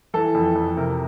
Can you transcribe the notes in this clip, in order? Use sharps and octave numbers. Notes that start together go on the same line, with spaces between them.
E3 A4
F2
F2
C3 A#4